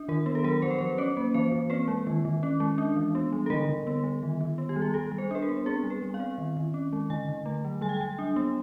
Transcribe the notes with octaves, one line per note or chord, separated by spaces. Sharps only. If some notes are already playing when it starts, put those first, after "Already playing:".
Already playing: D4
D#3 A#4
B3
A4
F#3 A#4
F3 C5
B4
F3 C5
C#4 C#5
A#3
E3 C5
E3
C4 B4
G#3
D#3
D#3
C#4
G#3
D4
E3
B3
G3
A4
D3 A#4
D3
B3
G3
D#3
D#3
B3
G4
G3
G#4
G3 A4
G3
C5
D4 B4
A#4
B3
C4 G#4
G3
B4
G3
F5
C4
D#3
D#3
C#4
G#3
D3 G#5
D3
A3
F#3
G3 G#5
G5
G3 G#5
D4
B3